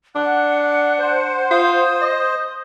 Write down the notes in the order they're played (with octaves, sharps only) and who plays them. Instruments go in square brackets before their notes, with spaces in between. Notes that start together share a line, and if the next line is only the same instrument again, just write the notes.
[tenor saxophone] D4 [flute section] F#5 [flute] F#6
[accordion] C5
[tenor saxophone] F4 [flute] D#6
[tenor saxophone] D#5